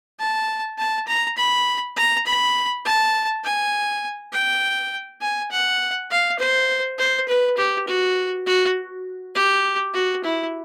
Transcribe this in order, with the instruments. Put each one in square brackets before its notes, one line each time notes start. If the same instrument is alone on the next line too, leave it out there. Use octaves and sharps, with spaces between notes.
[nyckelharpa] A5
A5
A#5
B5
A#5
B5
A5
G#5
G5
G#5
F#5
F5
C5
C5
B4
G4
F#4
F#4
G4
F#4
E4